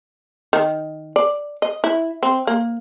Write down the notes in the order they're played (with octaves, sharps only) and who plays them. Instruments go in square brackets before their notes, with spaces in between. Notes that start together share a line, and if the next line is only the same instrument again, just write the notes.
[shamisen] D#3
D5
D#5
E4
C4
A#3